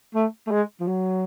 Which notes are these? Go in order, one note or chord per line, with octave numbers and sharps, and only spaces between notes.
A3
A3
G#3
F3
F#3